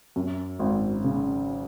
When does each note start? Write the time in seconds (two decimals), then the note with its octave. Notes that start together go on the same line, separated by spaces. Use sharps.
0.16 F#2
0.59 G#1
1.04 C#3